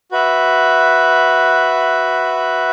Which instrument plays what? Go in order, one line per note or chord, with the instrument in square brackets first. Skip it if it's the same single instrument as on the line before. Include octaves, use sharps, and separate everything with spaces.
[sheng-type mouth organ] F#4 B4 E5